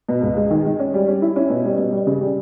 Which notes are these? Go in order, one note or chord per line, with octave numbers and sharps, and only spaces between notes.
B2
C#2
G#3
D#3
G#3
C#4
G3
C#4
E4
C#4
B2
G3
B2
G3
C#3
G3